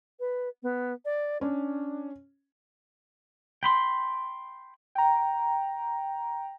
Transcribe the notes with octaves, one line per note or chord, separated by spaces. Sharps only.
B4
B3
D5
C#4 D4
G5 B5 C6
G5 A#5